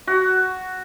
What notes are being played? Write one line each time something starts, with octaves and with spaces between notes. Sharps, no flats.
F#4